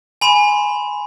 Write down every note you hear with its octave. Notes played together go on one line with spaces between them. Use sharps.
G#5 B5 C6 E7